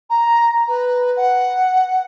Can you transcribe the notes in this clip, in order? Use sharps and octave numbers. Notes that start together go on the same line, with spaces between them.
A#5
B4
F#5